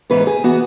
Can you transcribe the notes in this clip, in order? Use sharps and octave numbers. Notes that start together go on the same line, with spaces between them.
G#2 E3 B3 B4
G#4
E3 B3 F#4